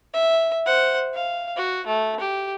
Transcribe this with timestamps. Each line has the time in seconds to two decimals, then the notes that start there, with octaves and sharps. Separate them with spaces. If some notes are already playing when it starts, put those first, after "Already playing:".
0.13 E5
0.66 C5 F#5
1.14 F5
1.56 F#4
1.87 A3
2.20 G4